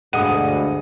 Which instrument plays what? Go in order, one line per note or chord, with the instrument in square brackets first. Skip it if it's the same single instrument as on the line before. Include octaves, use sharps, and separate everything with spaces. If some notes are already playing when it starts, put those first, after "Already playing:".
[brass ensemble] D2 [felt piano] G2 D#6 D#7 [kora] B2 G#3 [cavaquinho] F#5